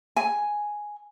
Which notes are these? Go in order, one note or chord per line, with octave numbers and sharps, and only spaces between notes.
G#5